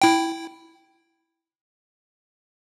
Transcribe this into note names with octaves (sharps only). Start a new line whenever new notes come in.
E4 G5